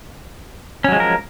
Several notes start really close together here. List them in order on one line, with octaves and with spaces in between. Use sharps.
C#4 F#3 G#3 F3 A#4